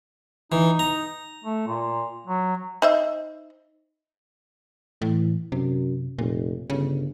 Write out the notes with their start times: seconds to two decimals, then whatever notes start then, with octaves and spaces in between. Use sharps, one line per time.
0.52 E3 D#4
0.79 A#5
1.44 A3
1.67 A#2
2.27 F#3
2.82 D#4 C5 E5
5.02 A2 E3
5.52 F#2 C3
6.19 F1 A#2
6.70 G1 C#3